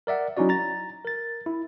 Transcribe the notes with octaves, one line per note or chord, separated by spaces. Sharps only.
A#4 D5 E5 F#5
F#3 C#4 D#4 E4 F#4 D5
A#5 A6
A#4 A6
E4